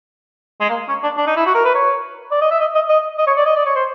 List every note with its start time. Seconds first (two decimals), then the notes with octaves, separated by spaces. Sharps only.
0.60 G#3
0.69 A#3
0.88 C#4
1.03 D4
1.17 D4
1.27 D#4
1.36 E4
1.46 F#4
1.55 A#4
1.65 B4
1.74 C#5
2.31 D5
2.41 D#5
2.51 E5
2.60 D#5
2.75 D#5
2.89 D#5
3.18 D#5
3.27 C#5
3.37 D5
3.46 D#5
3.56 D5
3.66 C#5
3.75 C5